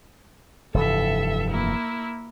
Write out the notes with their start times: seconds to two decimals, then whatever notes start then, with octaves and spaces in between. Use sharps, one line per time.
0.74 F1 G2 E3 A4 E5
1.51 A#3 E4